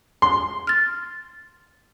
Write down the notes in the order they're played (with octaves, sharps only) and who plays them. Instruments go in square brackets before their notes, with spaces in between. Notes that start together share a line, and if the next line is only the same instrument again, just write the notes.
[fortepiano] C6
[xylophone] F6 A6